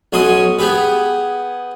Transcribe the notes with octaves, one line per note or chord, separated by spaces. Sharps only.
B1 C#4 F#4 G#5 C6 D#6
B3 G4 G#4 B4